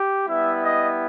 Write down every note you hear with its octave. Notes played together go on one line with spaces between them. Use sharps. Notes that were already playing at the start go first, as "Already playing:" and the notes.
Already playing: G4
G3 B3 E4 E5
D#5